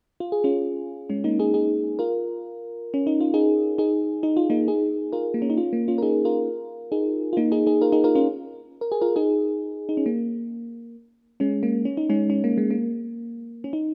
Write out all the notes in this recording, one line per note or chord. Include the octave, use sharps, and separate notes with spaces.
F4
G#4
C#4 F4
G#3 C#4
A#3 D#4
D#4 G#4
D#4 G#4
F4 A#4
C#4
D#4
F4
D#4 G#4
D#4 G#4
D#4
F4
A#3 D#4
D#4 G#4
F4 A#4
A#3
C#4
D#4
C#4 F4
A#3
C#4 F4
A#4
D#4 G#4
F4 A#4
D#4 G#4
F4
A#3 D#4
D#4 G#4
D#4 G#4
F4 A#4
D#4 G#4
F4 A#4
C#4 F4
A#4
G#4
F4 A#4
D#4 G#4
D#4
C#4
A#3
G#3 C#4
A#3
C#4
D#4
G#3 C#4
C#4
A#3
G#3
A#3
C#4
D#4